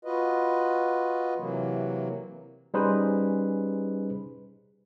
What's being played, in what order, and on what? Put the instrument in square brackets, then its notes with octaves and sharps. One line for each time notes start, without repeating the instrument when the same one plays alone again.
[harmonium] F4 F#4 B4 D#5
C3 E3 F#3 A#3
[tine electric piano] G3 C#4 D#4 G#4 B4 C5